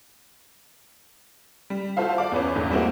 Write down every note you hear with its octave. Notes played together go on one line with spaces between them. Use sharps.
G3
F4 F#4 A4 C5 E5 F5
D5 F5 D6
E2 B3 C#4
A#1 E2 A2
G3 A3 A#3 C4 E4 F#4